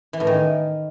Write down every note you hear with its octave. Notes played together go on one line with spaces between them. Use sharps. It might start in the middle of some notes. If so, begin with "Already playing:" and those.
E3
A2
D#3